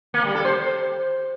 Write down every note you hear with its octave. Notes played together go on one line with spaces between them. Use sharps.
A#3
G3
A4
C5